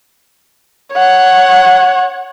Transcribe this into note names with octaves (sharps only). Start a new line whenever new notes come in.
C#5 F#5